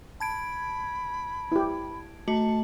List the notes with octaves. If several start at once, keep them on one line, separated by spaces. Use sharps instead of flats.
A5 B5 G#6 D7
E4 G4
A3 F#4 A5